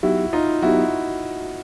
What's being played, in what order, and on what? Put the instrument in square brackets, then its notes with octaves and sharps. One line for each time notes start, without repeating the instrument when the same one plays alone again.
[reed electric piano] F#3 B3 D#4 G4 [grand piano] E4 F#4
[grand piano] D#4 F4
[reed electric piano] F#3 B3 D#4 G4 [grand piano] E4 F#4